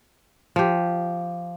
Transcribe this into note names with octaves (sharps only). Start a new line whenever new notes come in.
F3 G4